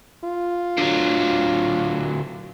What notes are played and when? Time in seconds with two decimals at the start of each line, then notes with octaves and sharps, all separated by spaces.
0.25 F4
0.77 D3 F#3